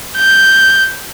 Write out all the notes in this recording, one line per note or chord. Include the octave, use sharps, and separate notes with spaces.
G6